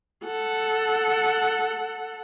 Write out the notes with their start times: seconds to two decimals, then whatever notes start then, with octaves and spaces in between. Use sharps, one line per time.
0.25 A4 F#5